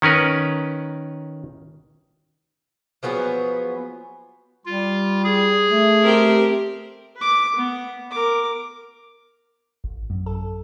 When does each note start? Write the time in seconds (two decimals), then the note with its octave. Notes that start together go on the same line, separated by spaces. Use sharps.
0.02 D#3 C#4 A#4 B4
3.03 F3 F#3 B3 G#4
4.66 G3 F4
5.24 G#4
5.69 A3
6.03 C4 G4 A#4
7.17 B4 D6
7.56 B3
8.11 A#4 D6
9.84 A1
10.10 F#2
10.26 A4